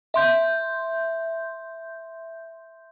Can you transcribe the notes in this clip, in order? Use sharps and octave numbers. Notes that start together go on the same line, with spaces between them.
E5 C6 G6